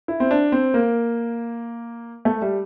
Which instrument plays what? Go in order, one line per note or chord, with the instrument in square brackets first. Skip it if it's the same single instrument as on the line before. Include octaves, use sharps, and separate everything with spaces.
[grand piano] E4
C4
D4
C4
A#3
A3
G3